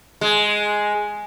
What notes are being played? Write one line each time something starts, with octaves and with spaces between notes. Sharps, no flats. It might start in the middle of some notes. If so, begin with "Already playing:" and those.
G#3